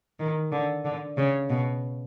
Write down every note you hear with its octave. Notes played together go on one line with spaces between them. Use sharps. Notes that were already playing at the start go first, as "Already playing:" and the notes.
D#3
D3
D3
C#3
B2